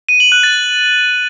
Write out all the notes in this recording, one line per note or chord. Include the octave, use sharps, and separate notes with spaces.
D#7
F#7
F#6
A6